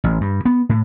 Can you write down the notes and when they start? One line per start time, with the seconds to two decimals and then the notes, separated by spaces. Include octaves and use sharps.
0.04 A1
0.21 G2
0.45 B3
0.69 A2